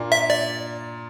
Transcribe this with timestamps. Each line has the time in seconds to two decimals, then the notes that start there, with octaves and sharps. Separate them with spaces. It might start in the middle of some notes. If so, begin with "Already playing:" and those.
Already playing: A#2 A#3 D4
0.12 E5
0.30 D5